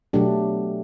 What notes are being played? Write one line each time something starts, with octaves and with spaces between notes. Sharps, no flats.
B2 F#3 A3 D4 G4